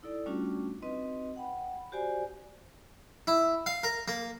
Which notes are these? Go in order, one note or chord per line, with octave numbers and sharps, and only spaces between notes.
D#4 E4 A4 D5
G3 A3 C#4 D4 F4 F#4
C4 D#4 F#4 B4 D#5
F#5 G5 B5
F#4 G4 C5 D5 G#5
E4
F5
A#4
A#3